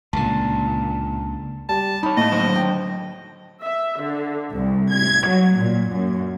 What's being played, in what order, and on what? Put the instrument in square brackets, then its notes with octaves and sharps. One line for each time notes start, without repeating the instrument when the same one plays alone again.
[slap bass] C#2 D3 [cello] A#2 [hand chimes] A5
[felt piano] G3 [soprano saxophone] A5
[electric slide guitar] D#4 C#5 [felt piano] B5
[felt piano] A2 [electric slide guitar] A#3 A5 [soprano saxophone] D#5
[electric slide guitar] D3 F#3 C5
[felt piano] G5
[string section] E5
D3
C2
G#6
F#3
A#2
F#2